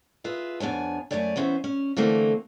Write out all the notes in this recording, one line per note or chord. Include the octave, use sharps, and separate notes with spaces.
F4 G#4 B4 E5
F2 B3 D4 C#5 G#5
F#2 F3 A3 C#5 D5 G#5
E3 B3 C#4 C5 E5
C#4
D3 E3 A3 A#3 C4